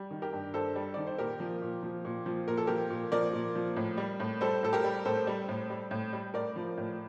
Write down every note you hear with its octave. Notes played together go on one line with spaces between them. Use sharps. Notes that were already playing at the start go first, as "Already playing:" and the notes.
Already playing: G3
D#3
G4 A#4
G2
G2 A4 C5
G3
D#3 D5
C5
A#2 G4 A#4
F3
A#2
F3
A#2
F3
A#2 A#4
A4
F3 G4 A#4
A#2
F3 A#4 D5
A#2
F3
A2
G3
A2
G3 A4 C5
A2 A4
G4 A#4
G3
A2 A4 C5
G3
A2
G3
A2
G3
A2 A#4 D5
F3
A2